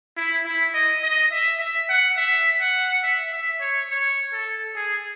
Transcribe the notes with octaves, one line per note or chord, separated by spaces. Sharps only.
E4
E4
D#5
D#5
E5
E5
F#5
E5
F#5
E5
E5
C#5
C#5
A4
G#4